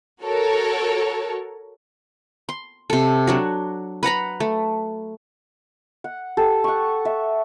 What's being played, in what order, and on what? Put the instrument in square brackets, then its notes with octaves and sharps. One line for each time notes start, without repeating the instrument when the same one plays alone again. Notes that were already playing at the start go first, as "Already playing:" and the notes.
[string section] F#4 A4 A#4 C#5
[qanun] C6
C3 A4
F#3 D4 F#4
B4 F#5 A#5 B5
A3
[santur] F#5
G4 A4
F#5 C#6
E5